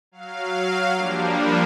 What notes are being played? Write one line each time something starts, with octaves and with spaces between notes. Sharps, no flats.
F#3 F5
F3 G3 A#3 D4